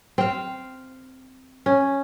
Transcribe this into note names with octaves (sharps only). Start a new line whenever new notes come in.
C4 F5
C#4